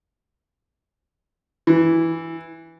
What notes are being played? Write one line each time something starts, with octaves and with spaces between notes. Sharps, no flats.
E3